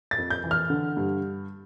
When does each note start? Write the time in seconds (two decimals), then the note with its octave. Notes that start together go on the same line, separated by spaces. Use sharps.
0.11 A6
0.18 F2
0.30 G6
0.44 E3
0.51 F6
0.70 D3
0.97 G2